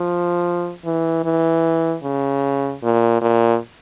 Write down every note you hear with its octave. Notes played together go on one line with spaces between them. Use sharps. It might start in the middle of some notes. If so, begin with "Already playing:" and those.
Already playing: F3
E3
E3
C#3
A#2
A#2